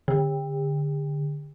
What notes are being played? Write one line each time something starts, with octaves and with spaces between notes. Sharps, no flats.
D3